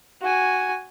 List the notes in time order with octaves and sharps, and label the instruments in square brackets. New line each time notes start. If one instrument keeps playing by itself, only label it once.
[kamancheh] F#4 G#5